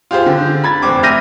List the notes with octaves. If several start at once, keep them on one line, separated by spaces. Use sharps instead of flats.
F4 G4 G#4 C5
D3
B5 G#6 A6
F1 C4 D6
E5 F6 G6 A#6 D#7